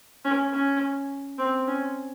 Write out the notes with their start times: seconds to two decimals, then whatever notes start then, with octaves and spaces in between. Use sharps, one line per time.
0.25 C#4
0.53 C#4
1.38 C4
1.67 C#4